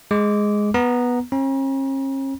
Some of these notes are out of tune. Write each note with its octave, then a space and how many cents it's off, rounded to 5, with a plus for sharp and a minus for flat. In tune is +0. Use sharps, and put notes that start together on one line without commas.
G#3 +0 D6 -15
B3 -10 A#5 +0
C#4 -45 A#5 +45